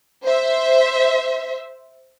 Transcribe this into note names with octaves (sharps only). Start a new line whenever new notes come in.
C5 E5